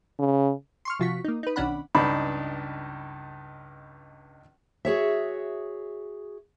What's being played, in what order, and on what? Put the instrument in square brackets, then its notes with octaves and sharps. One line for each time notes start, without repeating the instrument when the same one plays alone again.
[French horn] C#3
[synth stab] C6 C#6 F6
C3 F3 F4 F#4 C#6 B6
A#3 D#4
D#4 B4
B1 D#3 C#4 D4 F#5 B5
[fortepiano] C#2 G2 D4 D#4 B5
[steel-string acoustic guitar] F#4 G#4 C#5 E5